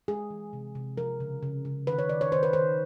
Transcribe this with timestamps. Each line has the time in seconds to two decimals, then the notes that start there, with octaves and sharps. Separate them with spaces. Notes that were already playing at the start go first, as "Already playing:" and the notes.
0.08 G#3 G#4
0.30 E3
0.53 C3
0.75 C3
0.98 F3 A#4
1.20 C#3
1.43 C#3
1.65 C#3
1.87 D#3 B4
1.99 C#5
2.09 D#3 D5
2.21 C#5
2.32 D#3 C5
2.43 B4
2.53 D#3 C5